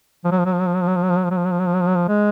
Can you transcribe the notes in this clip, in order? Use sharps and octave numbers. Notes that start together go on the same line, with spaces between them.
F3
F#3
F3
F#3
F3
F#3
F3
F#3
F3
F#3
F3
F#3
F3
F#3
F3
F#3
F3
F#3
F3
F#3
F3
F#3
F3
F#3
F3
G#3